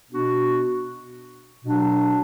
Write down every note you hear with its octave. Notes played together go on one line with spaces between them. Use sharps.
B2 B3 D4 F#4
B2 F#3 D4 F#4